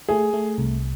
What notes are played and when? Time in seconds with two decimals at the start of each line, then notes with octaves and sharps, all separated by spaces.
0.09 A3 G#4
0.33 A3
0.58 C2